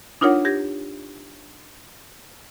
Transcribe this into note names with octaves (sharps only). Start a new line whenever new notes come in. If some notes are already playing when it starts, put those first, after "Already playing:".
D4 D#4 F4 A#4 C#5 F#5
G4 G#6 A#6